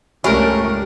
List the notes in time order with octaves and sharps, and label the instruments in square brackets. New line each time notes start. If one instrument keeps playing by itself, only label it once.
[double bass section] C#2 G2 A3 [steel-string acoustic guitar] G3 [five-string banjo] C#4 D4 A#4